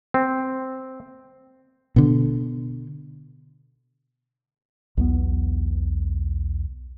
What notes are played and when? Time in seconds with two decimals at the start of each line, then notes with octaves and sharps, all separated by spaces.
0.14 C4
1.96 B2 D3
4.97 B1 E2 B3